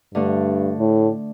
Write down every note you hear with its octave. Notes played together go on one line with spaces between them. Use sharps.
G2 D3 A3 D4
A2